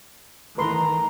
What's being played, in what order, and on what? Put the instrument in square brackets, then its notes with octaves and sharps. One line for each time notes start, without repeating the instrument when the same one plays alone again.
[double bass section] D#3 E3 A3 [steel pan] B4 C6 [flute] A#5